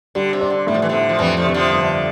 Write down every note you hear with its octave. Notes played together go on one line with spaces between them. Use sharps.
D3 G3
C3
D4
D3
A2 G3
F3
E3
A2 D3 F3
F3
F2 E3 G3
F3 A3
C3 E3
D3 F3
G1